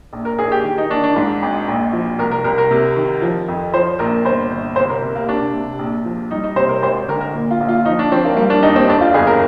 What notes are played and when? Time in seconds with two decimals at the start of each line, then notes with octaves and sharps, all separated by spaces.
0.13 A#1
0.25 A#4
0.39 A#1 G#4
0.52 G4
0.64 D#3
0.78 D#4
0.90 D#3 D4
1.04 D4
1.16 G#2
1.42 G#1
1.68 A#1
1.93 F3
2.18 C2 A#4
2.31 A#4
2.44 C2 A#4
2.58 A#4
2.71 C3
2.96 D#3
3.22 F3
3.48 F2
3.74 F3 C5
3.99 A#1 A#4
4.25 G1 C5
4.51 G1
4.76 C2 C5
4.89 A#4
5.02 C3
5.15 A#3
5.28 C3 D4
5.54 C3
5.79 A#1
6.05 F3
6.31 G3 D#4
6.44 D#4
6.56 C3 C5
6.69 A#4
6.82 G#1 C5
7.08 D3 A#4
7.21 A#4
7.34 A#2
7.51 F4
7.60 A#1
7.69 F4
7.85 F3 D#4
7.99 D4
8.11 F3 C4
8.25 A#3
8.37 G3 A#3
8.50 D4
8.63 D#2 D#4
8.76 C4
8.88 F2 D4
9.01 F4
9.14 G1 G#4
9.27 A#4